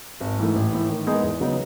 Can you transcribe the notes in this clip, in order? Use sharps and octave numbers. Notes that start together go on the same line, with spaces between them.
G#1
G#2 E3 A3
A1
A2 E3
D#3
G#3 B3 D#4 G#4
E2
C#3 F#3 B3 D#4